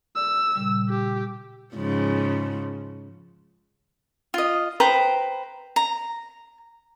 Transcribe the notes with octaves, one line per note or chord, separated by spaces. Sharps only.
D5 E6
A#2 C#3 G3
G4
G#2 C#3 F3
F4 D#5
B4 C5 G5 A#5
A#5